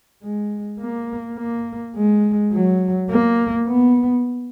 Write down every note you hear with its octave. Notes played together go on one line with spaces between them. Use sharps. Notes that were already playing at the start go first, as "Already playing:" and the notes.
G#3
A#3
A#3
G#3
F#3
A#3
B3